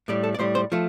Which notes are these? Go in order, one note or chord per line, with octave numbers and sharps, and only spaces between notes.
A2 G3 D5
A4
D5
A2 G3 C5
C5
F3 A3